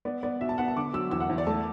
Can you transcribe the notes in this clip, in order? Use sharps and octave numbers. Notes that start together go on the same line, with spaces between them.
B3 D5
B3 D5
B2 E5
A5
B3 F#5
A5
D3 D6
F#3 E6
E2 E6
F#5
E2
D5
A3 A5